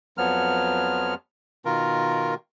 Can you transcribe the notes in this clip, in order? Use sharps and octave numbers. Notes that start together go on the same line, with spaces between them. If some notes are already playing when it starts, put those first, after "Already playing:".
F2 F3 F#3 B3 F6
B2 D#3 F4 A#4